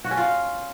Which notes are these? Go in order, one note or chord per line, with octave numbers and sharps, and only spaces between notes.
F#4
C#4
F4